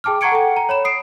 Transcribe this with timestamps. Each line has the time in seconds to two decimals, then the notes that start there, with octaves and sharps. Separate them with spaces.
0.04 G#4 G5 A5 D6 F6
0.21 F#5 A#5 C#6 G#6 C#7 D7
0.32 A4 F#5 G5
0.57 A#5
0.69 C#5 B5 E7
0.85 D#6 C7 D7